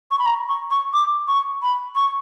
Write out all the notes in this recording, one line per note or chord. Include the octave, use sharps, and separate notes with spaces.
C#6
B5
A#5
C#6
C#6
D6
C#6
B5
C#6